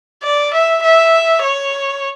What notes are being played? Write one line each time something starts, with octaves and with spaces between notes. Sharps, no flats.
D5
E5
E5
C#5